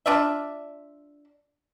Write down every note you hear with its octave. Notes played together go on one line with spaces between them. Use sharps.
D4 F4 D5 E5